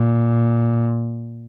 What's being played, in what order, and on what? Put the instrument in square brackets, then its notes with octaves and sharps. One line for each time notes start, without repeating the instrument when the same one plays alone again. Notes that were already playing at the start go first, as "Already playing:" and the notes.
Already playing: [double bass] A#2